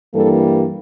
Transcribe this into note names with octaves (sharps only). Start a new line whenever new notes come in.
G2 E3 G3 A#3 A4